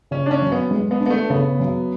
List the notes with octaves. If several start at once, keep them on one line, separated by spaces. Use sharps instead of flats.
C#3 C#4
D4
C#4
F#2
B3
G#3
B3
D4
B3
A3
C#3 B3
F#2